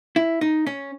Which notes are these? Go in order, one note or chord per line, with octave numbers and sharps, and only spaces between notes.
E4
D#4
C#4